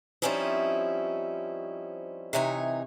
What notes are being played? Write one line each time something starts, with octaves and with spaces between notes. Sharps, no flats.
F3 G3 C4 C#4 D#4 E4
C3 E3 D#4 C#5 G#5